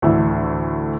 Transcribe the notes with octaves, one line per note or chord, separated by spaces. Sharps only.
D2 A2 D3 E3 E5